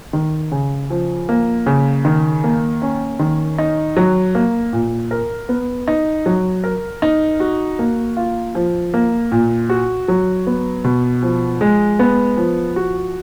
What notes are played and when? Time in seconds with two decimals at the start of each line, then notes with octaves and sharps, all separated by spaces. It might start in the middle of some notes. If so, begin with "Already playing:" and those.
0.13 D#3
0.52 C#3
0.90 F3
1.29 A#3
1.66 C#3
2.05 D#3
2.44 A#3
2.82 C#4
3.19 D#3
3.58 D#4
3.97 F#3
4.35 A#3
4.73 A#2
5.11 A#4
5.49 B3
5.87 D#4
6.26 F#3
6.64 A#4
7.02 D#4
7.40 F#4
7.79 A#3
8.17 F4
8.55 F3
8.94 A#3
9.32 A#2
9.70 F#4
10.08 F#3
10.47 B3
10.84 B2
11.23 F3
11.61 G#3
11.99 B3
12.37 F3
12.76 F#4